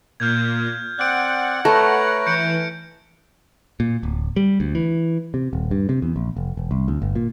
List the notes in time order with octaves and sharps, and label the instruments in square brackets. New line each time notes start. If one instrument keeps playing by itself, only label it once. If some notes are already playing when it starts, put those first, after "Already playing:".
[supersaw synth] A#2 [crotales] F6 G6 G#6
[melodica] C4 D5 [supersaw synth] F#5 [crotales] F#6 D7
[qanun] A3 [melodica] B4 C#5 A#5 [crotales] A#6
[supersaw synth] E3 [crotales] G6 C#7 D7
[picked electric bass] A#2
D1
G3
D2
E3
C3
D#1
G2
C3
E2
A#1
F1
E1
C2
D2
G1
A#2